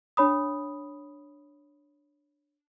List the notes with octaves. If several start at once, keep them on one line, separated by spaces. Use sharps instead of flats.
D4 C#5 B5 D#6